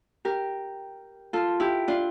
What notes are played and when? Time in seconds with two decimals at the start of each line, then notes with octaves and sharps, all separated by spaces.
0.25 G4 A#4
1.33 F4 A4
1.60 E4 G4
1.88 D4 F4